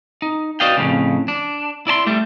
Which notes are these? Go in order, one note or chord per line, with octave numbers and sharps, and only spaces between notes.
D#4
F#4 B4 D5 D#5 F5 G5
F2 A2 C#3
D4
E4 D5 A5 C6
G3 A3 A4